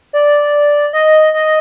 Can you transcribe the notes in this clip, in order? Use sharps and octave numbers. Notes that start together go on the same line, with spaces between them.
D5
D#5
D#5